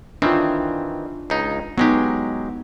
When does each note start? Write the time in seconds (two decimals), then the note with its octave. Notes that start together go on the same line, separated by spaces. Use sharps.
0.22 D#3 E3 C4 D4 F4
1.30 C#2 D#4
1.78 F#3 G#3 B3 D#4 G4